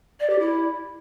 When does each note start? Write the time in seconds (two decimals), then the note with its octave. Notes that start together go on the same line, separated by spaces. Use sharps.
0.20 D5
0.30 G4
0.39 E4